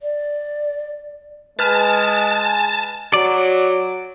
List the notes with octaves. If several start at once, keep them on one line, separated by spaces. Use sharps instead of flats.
D5
G#3 B4 G#5 A5 F6
F#3 D5